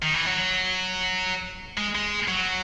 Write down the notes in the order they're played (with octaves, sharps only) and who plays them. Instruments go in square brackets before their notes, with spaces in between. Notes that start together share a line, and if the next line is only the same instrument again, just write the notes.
[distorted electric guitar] D#3
E3
F#3
G#3
G#3
F#3